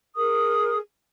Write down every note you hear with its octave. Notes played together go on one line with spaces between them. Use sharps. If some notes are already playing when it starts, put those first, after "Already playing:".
G#4 A#4 D#6